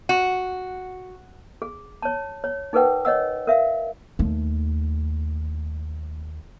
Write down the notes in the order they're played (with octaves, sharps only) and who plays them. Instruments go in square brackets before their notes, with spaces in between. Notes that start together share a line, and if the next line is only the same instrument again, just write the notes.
[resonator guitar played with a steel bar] F#4
[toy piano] G#4
C#5 A5
C#5
D#4 G#4 A#4 B4 F#5 G5
C#5 D#5 F#5 E6
A#4 E5 F5
[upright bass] D#2 A3